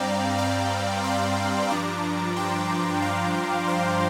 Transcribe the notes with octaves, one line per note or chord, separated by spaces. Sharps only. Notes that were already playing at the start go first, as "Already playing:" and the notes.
Already playing: G2 G3 C4 D5 F5 G5 A#5
F5 A#5
G5 C6
G2 F3 D4 A#5 D6
G5 C6
F5 A#5
C5 F5